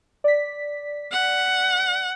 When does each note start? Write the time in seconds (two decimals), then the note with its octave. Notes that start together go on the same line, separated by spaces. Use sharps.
0.24 D5 B6
1.12 F#5